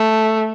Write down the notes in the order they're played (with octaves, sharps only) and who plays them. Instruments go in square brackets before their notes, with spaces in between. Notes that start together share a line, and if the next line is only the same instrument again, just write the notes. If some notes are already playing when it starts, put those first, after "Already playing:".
Already playing: [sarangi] A3